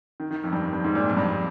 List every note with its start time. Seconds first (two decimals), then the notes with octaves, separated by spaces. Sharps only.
0.20 D#3
0.31 D#3
0.44 F2
0.53 G2
0.62 F2
0.73 G2
0.84 G#2
0.95 A#2
1.10 F2
1.17 G2